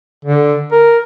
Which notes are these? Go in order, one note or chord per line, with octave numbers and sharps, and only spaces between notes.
D3
A#4